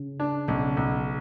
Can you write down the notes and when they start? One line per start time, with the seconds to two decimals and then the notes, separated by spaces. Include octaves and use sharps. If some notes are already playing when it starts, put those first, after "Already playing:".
Already playing: C#3
0.20 D4
0.48 B1 C#3
0.77 B1